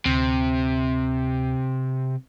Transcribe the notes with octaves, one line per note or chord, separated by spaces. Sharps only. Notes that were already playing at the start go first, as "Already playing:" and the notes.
D2 C3